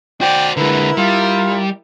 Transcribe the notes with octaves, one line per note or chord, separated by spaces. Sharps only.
F#4 C5 D5 G5
D3 G#3 E4 A#4 B4
G3 F4